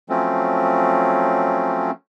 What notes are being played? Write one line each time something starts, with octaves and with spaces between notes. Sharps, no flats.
F3 F#3 A3 C4 C#4